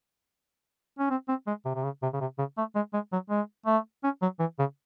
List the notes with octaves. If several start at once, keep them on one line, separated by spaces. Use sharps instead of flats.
C#4
C4
C4
G#3
C3
C3
C#3
C3
C#3
C3
C#3
A3
G#3
G#3
F#3
G#3
A3
C#4
F#3
E3
C#3